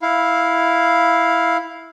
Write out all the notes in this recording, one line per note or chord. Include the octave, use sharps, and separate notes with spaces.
E4 F5